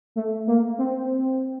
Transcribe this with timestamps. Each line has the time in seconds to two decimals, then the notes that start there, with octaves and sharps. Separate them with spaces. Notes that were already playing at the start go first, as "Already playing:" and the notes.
0.16 A3
0.47 A#3
0.78 C4